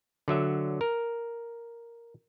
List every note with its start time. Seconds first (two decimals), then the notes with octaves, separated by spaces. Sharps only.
0.28 D3 F#3 E5
0.81 A#4